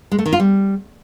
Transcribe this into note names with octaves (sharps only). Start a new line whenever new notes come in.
G#3
A3
D#3
F4
G3